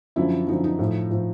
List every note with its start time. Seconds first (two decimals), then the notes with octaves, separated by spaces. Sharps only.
0.16 F#2 D3 F3 E4
0.47 F#2 D3 F3 D#4
0.64 D#4
0.79 A2 F3
1.10 A2 F3